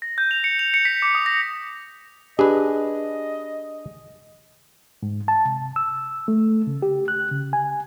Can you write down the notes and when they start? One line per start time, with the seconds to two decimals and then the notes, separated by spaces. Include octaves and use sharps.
0.02 A#6
0.18 G6
0.31 F7
0.44 C#7
0.59 F7
0.74 C#7
0.85 B6
1.02 D6
1.15 D#6
1.26 A#6
2.39 D4 G4 G#4 B4 D#5
5.03 G#2
5.28 A5
5.45 C3
5.76 E6
6.28 A3
6.67 C#3
6.82 G4
7.08 F#6
7.31 C#3
7.53 G#5